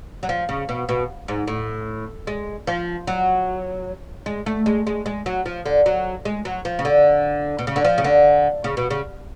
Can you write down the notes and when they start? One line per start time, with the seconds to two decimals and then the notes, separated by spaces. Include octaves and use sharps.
0.23 F#3
0.29 F3
0.49 C#3
0.69 B2
0.89 B2
1.28 G#2
1.48 A2
2.27 G#3
2.67 F3
3.07 F#3
4.26 G#3
4.46 A3
4.66 G#3
4.87 G#3
5.06 G#3
5.26 F#3
5.46 F3
5.66 D3
5.86 F#3
6.25 G#3
6.45 F#3
6.65 F3
6.79 C#3
6.85 D3
7.59 B2
7.67 C#3
7.76 D3
7.85 F3
7.98 C#3
8.04 D3
8.64 C#3
8.77 B2
8.90 C#3